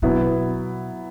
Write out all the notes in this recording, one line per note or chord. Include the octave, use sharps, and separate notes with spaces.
B2 F#3 B3 E4